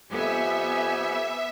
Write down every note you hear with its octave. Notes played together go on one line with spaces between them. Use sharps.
F2 B3 G4 E5 G#5